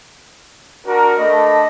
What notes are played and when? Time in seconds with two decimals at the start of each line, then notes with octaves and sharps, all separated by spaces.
0.86 D4 F#4 A#4
1.18 A3 D4 D#5 B5